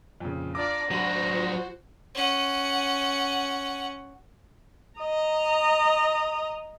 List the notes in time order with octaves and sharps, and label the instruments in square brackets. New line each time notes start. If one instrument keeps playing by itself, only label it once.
[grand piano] F2 A#2 C#3
[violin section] D4 F4 D5 [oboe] A#5 [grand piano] D6 F6
[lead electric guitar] F#3 D4 [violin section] F#4 C5 [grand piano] B5 D#7 F#7
[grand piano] F3
[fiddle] C#4 F#5
[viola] D#5 A#5